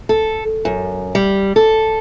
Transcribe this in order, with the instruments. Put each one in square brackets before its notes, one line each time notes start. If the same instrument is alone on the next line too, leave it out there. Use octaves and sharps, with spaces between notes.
[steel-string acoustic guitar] A4
F#2
G3
A4